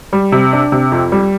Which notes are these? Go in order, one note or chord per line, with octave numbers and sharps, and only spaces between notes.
G3
C3
D4
C3
F2
G3